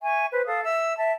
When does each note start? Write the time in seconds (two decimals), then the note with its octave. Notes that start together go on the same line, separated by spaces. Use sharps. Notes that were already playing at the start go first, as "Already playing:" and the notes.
0.02 E5 G#5 C#6
0.32 B4 C5
0.46 A4 F5 D#6
0.65 E5 E6
0.97 E5 A5